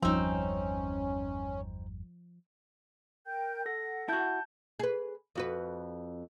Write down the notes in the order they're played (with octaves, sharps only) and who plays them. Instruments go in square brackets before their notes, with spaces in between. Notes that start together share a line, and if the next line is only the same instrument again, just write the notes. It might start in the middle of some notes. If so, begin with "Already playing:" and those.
[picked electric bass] G1 E2 G3 [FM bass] F3 [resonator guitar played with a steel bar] C4 D#4 [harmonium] C#4
[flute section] A#4 G5 G6
[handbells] A4 A#6 [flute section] F#5
[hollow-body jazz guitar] E4 F#4 [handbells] A5 G6
[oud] G#4 B4
F2 F#4 B4